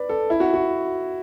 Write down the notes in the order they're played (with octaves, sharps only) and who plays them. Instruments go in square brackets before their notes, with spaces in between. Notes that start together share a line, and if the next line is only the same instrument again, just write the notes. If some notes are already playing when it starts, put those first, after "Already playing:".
Already playing: [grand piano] B4 D5
A4
E4
F#4
F#4